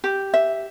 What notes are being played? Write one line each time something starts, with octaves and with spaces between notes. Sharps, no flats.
G4
E5